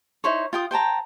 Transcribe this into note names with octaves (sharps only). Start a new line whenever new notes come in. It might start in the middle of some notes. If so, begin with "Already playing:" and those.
D#4 E4 C5 C#5
F4 G5 D#6
C5 G5 A5 A#5